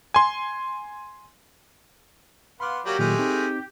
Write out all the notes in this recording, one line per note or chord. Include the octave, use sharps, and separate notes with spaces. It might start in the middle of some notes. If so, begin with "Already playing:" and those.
G#5 C6
B3 F5 F#5 B5 C6 D6
F#3 A#3 G4 D5
A#2 D#3 F#3 G#3 A3
C4 D#4